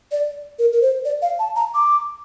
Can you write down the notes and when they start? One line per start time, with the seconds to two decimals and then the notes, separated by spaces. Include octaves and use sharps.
0.12 D5
0.59 A#4
0.73 A#4
0.82 C5
1.05 D5
1.22 F5
1.39 A5
1.56 A#5
1.74 D6